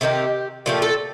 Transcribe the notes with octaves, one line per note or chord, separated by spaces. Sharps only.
C3 D#3 A#3 G4
A#2 F3 A3 G4
A4